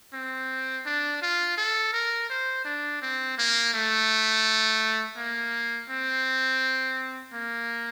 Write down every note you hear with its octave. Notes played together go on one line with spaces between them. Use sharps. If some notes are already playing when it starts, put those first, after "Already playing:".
C4
D4
F4
A4
A#4
C5
D4
C4
A#3
A3
A#3
C4
A#3